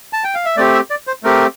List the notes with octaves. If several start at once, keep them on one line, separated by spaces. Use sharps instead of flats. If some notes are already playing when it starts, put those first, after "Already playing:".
A5
G5
F5
E5
A3 C4 G4 D5
E5
D5
C5
A3 C4 G4 A#4